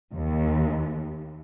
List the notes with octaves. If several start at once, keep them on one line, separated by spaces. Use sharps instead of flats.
D#2